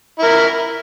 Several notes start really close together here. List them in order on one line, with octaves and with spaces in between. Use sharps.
E4 A#4 E5